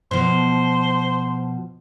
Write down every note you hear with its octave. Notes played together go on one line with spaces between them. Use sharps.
B2 F3 C5